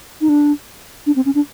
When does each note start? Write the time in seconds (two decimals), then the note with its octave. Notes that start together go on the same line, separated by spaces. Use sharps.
0.21 D#4
0.29 D4
1.06 D4
1.16 C4
1.26 C#4
1.35 D4